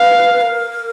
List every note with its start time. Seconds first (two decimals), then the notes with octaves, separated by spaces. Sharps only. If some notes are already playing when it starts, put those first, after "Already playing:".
Already playing: B4 F5
0.41 A#4